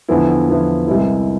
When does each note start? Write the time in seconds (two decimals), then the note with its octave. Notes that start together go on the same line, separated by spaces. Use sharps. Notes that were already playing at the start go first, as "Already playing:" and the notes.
0.08 E2 D3 F3 B3 E4
0.48 E2 D3 F3 B3 E4
0.87 C2 C3 G#3 B3 E4